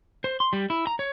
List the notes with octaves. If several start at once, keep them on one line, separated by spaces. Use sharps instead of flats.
C5
C6
G3
E4
A#5
C#5